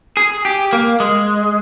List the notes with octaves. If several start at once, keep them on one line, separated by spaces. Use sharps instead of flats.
G#4
G4
A#3
G#3